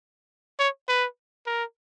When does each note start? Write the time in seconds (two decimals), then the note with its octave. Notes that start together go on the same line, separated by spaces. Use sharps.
0.59 C#5
0.89 B4
1.47 A#4